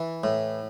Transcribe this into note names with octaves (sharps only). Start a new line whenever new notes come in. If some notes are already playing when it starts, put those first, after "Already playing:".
Already playing: E3
A2